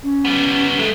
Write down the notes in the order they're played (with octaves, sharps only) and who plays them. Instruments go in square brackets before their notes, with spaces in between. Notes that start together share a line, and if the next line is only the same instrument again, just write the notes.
[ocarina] C#4
[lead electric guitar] G3 B3
[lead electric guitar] G#3 A3 [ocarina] A4